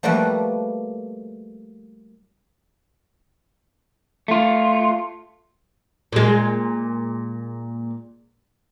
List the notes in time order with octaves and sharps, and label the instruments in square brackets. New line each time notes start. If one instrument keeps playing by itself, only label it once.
[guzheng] F3 G3 A3 A#3 F#4 B4
[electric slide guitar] A3 F4
[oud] A#2 G#3